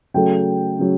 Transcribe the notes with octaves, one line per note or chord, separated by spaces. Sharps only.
C#3 F#3 A3 G5
C#3 F#3